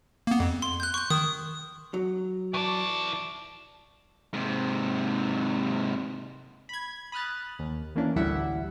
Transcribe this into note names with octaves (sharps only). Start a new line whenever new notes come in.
A#3 B3
F2
C6
F#6 G6
C#6 F#6
D#3 D#6
F#3
E3 A4 D5 C#6
G#2 C3
B5 G#6
B5 D#6 F6 F#6 A6
D#2
E3 A#3 C#4 D4
A1 D2 G3 E4 E5 F#5